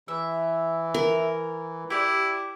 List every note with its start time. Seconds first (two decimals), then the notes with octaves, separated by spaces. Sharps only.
0.08 E3 E5
0.94 A#4
1.90 E4 G4 D5